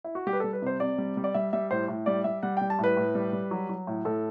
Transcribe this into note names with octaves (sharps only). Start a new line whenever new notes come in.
E4
F#4
G3 G4
B4
G3 A4
B4
C3 C5
C3 D5
G3
G3
D5
G3 E5
G3 E5
A2 C5
A2
G3 D5
G3 E5
G3 F#5
G5
G3
A5
A2 B4
A2
G3
G3
F#3
F#3
A2
A2 A4